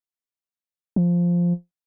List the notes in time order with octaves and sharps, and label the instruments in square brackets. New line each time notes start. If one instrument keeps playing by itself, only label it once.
[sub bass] F3